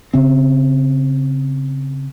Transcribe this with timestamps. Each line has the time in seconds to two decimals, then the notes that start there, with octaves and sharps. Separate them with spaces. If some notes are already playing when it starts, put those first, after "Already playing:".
0.14 C#3 C4